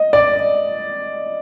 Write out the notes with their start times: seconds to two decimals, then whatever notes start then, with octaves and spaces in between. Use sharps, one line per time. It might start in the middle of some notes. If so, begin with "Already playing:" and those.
Already playing: D#5
0.13 D5